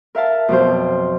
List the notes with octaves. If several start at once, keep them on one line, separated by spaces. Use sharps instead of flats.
A#4 E5 F5 A5
F2 B2 F#3 C5